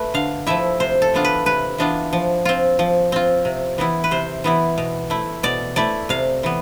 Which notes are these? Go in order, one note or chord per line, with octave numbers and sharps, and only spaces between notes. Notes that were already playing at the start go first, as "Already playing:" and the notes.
Already playing: A3 B4
D3 F5
F3 A3 E4 E5
C3 C5
A4
E3 B3 D4 F4
B4
C3 B4
E3 B3 D4 F4
F3
C4 F4
F3
C4 F4
C3
E3 B3 E4
B4
C3 C5
E3 B3 E4
B2
A3 E4
B2 D5
A3 E4 D5
C3 F5
E3 B3